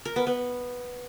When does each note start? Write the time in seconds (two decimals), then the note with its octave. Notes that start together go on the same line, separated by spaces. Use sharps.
0.05 A#4
0.16 B3
0.27 B3